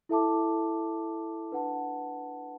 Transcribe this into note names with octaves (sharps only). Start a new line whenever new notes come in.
E4 A4 E5 A5 D6
D4 B4 F#5 A5